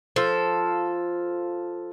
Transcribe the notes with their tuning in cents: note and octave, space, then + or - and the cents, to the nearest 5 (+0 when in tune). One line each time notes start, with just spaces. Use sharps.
F3 +0 A4 +0